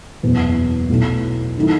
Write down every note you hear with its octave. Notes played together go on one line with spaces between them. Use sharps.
F#1 E2 B2 F#3
B1 B2 F#3 A3 E4
D#3 F#3 A3 E4